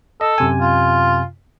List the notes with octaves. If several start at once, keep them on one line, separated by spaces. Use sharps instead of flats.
A4 D#5
F#2 C3 G#5
F4